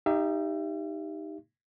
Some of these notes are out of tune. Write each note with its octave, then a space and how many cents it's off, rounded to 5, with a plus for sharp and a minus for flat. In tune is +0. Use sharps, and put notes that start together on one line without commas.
D#4 +0 G4 +5 E5 +40